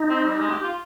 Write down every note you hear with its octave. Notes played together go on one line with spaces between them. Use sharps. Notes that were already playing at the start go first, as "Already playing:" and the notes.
Already playing: D#4
C4
G3
G#3
G4
F4